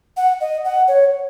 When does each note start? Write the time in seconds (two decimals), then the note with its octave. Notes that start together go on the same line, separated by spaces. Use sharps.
0.17 F#5
0.41 D#5
0.65 F#5
0.88 C#5